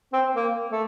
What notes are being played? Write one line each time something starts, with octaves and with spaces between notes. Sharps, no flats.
C4
A#3
A3